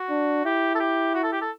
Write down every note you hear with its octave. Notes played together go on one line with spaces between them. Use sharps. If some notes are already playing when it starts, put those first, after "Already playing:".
Already playing: F#4
D4
E4 G4
A4
G4
F#4
A4
G4
A4